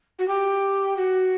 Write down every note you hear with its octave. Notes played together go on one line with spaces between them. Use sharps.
F#4
G4
F#4